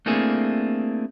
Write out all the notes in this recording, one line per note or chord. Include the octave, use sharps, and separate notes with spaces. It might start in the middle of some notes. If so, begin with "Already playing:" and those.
A3 A#3 C4 D4 E4 G#4